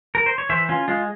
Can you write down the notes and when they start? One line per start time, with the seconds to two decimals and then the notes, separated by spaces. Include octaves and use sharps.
0.15 A#4
0.26 C5
0.38 C#5
0.49 E3 C5 E5
0.69 C#4 F4
0.88 G#3 F4